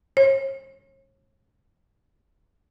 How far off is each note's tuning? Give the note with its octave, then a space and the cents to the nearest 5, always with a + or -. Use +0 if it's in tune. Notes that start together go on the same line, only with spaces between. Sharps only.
C#5 -40